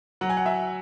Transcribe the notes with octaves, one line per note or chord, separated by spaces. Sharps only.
F#3 F#5
G#5
F#5
E5